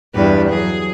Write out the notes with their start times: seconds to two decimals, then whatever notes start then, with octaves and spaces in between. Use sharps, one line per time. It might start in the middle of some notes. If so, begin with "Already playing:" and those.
0.15 E2 G2 B4
0.49 F#3 G#4